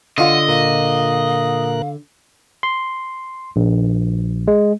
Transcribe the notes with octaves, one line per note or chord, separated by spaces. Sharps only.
D3 F4 D#5 F#5
A#2 A#4 F5 F#6
C6
A#1
G#3